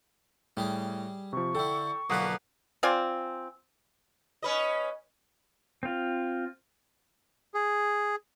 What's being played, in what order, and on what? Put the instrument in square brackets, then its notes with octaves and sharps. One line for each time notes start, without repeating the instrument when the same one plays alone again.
[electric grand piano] A2 [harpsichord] G3 G4 G#4
[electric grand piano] C3 F3 [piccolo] C#6
[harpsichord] D3 E4 [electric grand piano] A4 G5
[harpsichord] B1 D3 B4 [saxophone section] F3 A#3 B3 [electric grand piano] D#6 F#6
[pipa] C4 F4 D5 G#5
[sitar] C#4 B4 D#5
[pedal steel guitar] C4 F4
[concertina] G#4